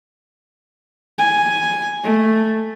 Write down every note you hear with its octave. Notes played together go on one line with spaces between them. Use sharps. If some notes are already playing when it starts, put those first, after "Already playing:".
G#5
A3